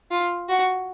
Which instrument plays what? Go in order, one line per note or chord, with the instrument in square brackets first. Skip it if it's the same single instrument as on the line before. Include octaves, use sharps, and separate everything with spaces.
[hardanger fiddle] F4
F#4